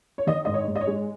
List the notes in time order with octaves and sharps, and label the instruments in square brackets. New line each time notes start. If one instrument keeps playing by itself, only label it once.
[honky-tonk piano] C#5
D#3 D#5
G#2 D#5
C#5
G#2
D#5
C#5
G#3